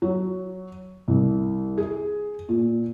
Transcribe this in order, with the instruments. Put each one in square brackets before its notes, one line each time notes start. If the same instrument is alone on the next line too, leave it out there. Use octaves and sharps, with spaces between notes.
[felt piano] F#3
C2
G#4
A#2